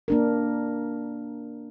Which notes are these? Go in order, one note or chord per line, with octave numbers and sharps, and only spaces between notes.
A#3 D4 A#4